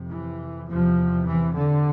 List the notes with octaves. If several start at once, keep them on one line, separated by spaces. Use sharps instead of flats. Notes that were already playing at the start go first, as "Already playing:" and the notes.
Already playing: F2 C3
E3
E2 C3 F3
E3
D3